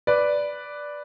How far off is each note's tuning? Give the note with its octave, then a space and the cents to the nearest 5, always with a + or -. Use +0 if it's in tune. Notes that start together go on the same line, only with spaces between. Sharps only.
B4 +0 D5 +0